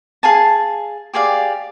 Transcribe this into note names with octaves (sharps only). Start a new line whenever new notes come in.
G#4 F5 G#5 A5
G4 G#4 D5 F5